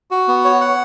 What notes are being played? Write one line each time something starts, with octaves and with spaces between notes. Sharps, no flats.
F#4
B3
C#5
F#5